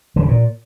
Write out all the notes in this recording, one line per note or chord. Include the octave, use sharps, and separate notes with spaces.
D3
C#3
A#2